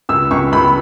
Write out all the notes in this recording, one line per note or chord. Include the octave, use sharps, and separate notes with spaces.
C#2 E6
C#2 C#6
C#2 B5